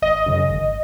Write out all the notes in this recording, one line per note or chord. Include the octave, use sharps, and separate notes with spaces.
G#1 D#5
F#2 C#3
G#1